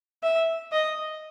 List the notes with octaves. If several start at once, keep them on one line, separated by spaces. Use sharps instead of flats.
E5
D#5